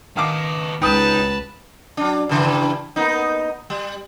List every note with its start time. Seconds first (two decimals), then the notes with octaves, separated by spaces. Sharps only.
0.17 D#3 B3 F5 A5 D6
0.82 C#2 D#4 B4 G5 A5 D#6
1.97 F#3 D4
2.29 G2 C#3 E3
2.96 A#3 B3 D#4
3.70 G3